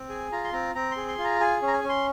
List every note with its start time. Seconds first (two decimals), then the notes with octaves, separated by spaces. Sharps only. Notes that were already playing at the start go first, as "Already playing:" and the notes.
Already playing: C4
0.09 G#4 G#5
0.32 F4 A#5
0.44 C6
0.53 C4 A#5
0.75 C4 A#5
0.91 C6
0.97 G#4
1.08 C6
1.18 F4
1.24 A#5
1.40 G#4 G#5
1.62 C#4
1.68 A#5
1.73 G#5
1.84 C#4
1.89 C6